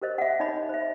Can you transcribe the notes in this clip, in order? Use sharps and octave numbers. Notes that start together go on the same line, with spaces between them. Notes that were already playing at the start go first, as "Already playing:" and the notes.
G4 A#4 C5 D#5
E5 F#5
D#4 C#5 D#5 B5
C5 E5